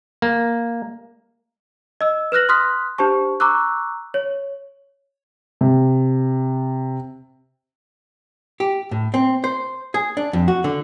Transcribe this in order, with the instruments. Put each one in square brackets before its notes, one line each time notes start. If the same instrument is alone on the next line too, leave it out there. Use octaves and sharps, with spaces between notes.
[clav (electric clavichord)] A#3
[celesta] D#5 E6
B4 F6 F#6 A#6 F#7
C6 D#6 F6 F#6 B6
D4 G4 C5 A5 C#6
A#5 C#6 D6 E6 F#6
C#5
[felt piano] C3
[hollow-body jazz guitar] G4
A2
C4
C5
G#4
D4
F2
F#4
D3